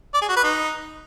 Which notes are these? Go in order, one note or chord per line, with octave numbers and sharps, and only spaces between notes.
D5
G#4
F#4
B4
D#4